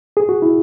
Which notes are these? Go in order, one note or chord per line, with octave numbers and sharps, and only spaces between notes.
G#4
F#4
E4